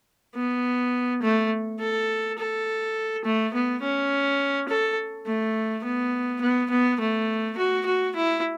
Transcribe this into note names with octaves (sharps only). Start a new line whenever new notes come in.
B3
A3
A4
A4
A3
B3
C#4
A4
A3
B3
B3
B3
A3
F#4
F#4
E4